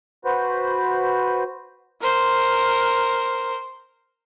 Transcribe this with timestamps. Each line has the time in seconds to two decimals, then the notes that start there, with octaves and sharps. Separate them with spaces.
0.25 F#4 B4 C5
2.01 A#4 C5